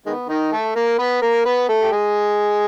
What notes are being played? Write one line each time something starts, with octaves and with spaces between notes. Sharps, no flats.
D#3 G#3 B3
D#3 D#4
A3 A4
A#3 A#4
B3 B4
A#3 A#4
B3 B4
A3 A4
G4
G#3 G#4